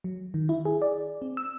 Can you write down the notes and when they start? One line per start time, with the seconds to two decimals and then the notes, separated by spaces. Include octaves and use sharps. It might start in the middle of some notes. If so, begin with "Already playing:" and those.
0.04 F#3
0.34 D#3
0.49 E4
0.65 G#4
0.82 D5
1.22 C4
1.37 E6